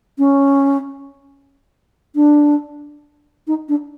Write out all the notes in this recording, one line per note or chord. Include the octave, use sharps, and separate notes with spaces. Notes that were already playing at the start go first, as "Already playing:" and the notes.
C#4
D4
D#4
D4